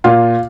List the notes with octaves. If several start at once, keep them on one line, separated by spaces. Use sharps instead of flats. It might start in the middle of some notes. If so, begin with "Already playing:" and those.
A#2 F4 F5